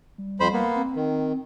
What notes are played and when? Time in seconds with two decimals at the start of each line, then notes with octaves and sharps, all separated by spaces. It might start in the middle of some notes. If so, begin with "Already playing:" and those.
0.18 G3
0.40 F2 C5 B5
0.53 A#3 B3
0.76 C4
0.96 D#3